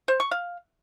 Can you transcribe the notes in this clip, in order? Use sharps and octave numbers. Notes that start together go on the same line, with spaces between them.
C5
C#6
F5